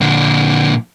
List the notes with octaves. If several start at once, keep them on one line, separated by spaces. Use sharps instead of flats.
A#2 D3